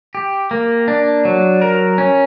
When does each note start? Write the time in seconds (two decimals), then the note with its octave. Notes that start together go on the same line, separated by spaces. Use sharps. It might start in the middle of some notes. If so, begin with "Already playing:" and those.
0.15 G4
0.51 A#3
0.88 D4
1.25 F#3
1.61 A#4
1.98 C#4